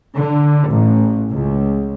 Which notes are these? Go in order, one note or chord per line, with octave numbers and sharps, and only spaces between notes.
D3
A1
C#2